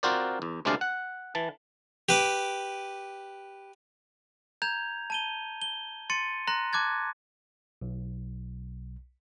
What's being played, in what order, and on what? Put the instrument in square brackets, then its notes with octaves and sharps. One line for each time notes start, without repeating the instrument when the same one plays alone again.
[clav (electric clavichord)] C4 F4 F#4 A#4 C5 D5
E2
D2 C3 G#3 D4 D5 F5
F#5
E3 A5
[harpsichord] G4 B4 D6
[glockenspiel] A#5 G6 G#6 F7
A5 D#7 G7
G7
C6 A6 C#7 D#7
A#5 C6 F#6 A#6
A5 D6 F#6 G#6 A6
[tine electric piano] B1